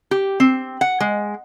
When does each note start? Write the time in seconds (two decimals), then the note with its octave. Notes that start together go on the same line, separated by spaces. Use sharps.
0.11 G4
0.40 C4
0.81 F#5
1.00 G#3